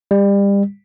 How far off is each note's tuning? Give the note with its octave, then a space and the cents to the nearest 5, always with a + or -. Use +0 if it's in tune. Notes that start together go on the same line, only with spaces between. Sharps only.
G3 +30